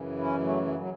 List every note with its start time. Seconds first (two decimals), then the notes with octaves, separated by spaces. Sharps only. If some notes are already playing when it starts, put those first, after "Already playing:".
Already playing: F#2 C#3 E3
0.19 C#4 E4
0.37 G#3
0.42 F#3 A3
0.66 F#3
0.79 F#3